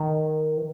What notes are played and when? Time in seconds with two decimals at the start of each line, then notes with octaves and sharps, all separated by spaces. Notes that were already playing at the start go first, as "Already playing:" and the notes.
Already playing: D#3
0.57 E3